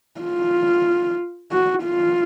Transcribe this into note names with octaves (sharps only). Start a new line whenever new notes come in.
F4
F#4
F4